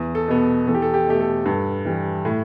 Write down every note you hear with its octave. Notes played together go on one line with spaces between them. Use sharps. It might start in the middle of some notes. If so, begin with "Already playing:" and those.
Already playing: E2
A4
B2 B3
E2 A4
G4
A4
G4
B2 A3 G4
A4
G2
E3 G3
A2